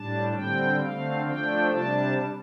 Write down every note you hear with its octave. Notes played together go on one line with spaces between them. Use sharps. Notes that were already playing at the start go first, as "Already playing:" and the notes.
Already playing: A2 G3 D4 A5
D3 G3 C4 G5
D3 A3 C4 F5
F3 A3 D4 G5
C3 G3 D4 A5